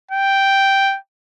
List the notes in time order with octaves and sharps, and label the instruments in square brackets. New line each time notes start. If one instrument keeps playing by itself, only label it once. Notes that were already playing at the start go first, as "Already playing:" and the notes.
[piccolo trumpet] G5